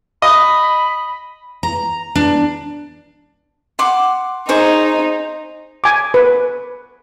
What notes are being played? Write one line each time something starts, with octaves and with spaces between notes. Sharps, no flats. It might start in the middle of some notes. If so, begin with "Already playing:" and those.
D#5 B5
A#5
D4
F#5 C6 D6
D#4 G#4 C5 C#6
G#5 D6
B4